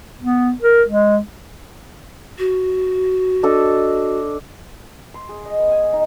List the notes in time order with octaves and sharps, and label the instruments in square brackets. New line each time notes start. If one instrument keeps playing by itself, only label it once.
[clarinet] B3
A#4
G#3
[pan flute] F#4
[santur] D4 A4 D#5
C6
G#4
D#5
B3
G#5
D#4